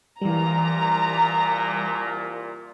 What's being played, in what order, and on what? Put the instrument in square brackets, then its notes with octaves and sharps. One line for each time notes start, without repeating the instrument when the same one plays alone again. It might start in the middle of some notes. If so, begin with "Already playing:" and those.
[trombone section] C2 A#2 [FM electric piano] E3 G3 [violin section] A#5